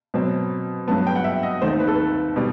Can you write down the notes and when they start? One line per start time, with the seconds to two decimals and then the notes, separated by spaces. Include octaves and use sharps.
0.14 B2 F#3 C4
0.88 G2 F#3 B3 A5
1.07 G5
1.15 F#5
1.24 E5
1.43 D#5
1.61 D#2 D#3 A3 C4 C5
1.80 B4
1.87 A4
1.95 B4
2.36 B2 G3